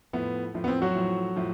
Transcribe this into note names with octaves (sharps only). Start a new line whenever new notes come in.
A2 F3 B3
A2 F3
B3
C4
F#3 F#4
A2 F3
A2 F3